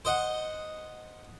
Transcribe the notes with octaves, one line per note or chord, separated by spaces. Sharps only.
C5 D#5 F#5